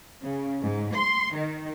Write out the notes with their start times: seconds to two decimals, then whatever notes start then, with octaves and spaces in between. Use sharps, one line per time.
0.22 C#3
0.64 G#2
0.96 C6
1.35 D#3